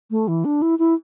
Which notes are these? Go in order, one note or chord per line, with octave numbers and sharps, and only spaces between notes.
A3
E3
D4
E4
E4